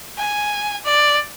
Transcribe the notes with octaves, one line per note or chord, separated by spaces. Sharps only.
G#5
D5